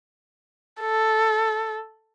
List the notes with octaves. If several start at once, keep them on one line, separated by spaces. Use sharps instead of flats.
A4